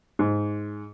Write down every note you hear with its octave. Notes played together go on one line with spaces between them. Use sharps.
G#2